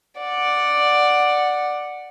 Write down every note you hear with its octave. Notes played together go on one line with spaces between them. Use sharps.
D5 F#5